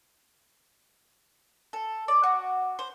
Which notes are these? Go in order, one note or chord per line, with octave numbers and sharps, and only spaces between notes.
A4
D5
F#4
C5